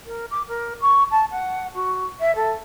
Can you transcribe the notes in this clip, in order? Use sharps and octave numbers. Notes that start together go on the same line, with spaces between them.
A#4
D6
A#4
C#6
A5
F#5
F#4
E5
A4